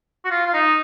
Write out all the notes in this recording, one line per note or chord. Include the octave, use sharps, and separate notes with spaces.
F#4
F4
F4
D#4